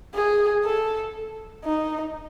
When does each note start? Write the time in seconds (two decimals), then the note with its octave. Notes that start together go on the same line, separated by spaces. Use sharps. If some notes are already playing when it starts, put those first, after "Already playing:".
0.14 G#4
0.64 A4
1.65 D#4